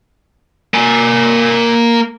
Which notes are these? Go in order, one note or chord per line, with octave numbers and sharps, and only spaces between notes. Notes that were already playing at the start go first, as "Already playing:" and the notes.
A#3 G#5